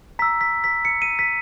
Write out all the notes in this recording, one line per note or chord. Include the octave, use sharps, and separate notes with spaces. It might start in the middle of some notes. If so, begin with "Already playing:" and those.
A#5 E6 B6
B6
B6
C#7
D#7
B6